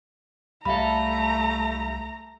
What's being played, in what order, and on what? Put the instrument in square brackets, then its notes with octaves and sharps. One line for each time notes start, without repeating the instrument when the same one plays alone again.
[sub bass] C2 [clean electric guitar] G3 A4 [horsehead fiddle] A3 A#5 [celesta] E5 F5 B5